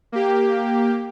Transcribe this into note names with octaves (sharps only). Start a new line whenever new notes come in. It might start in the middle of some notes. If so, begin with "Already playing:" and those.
A#3 G4